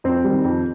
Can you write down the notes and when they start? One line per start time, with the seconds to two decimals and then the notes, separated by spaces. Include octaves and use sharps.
0.04 F2 C4
0.24 G3
0.29 D#3
0.45 F2